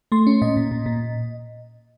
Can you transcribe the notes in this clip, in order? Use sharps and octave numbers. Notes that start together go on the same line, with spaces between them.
A3 C6
C#4
A#2 D#5
A#2
A#2
A#2